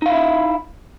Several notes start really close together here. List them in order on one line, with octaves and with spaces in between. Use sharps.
D#4 F5 E4 E5